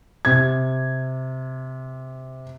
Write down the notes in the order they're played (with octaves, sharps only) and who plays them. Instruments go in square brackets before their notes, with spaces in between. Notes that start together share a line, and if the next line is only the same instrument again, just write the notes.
[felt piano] C3 G#6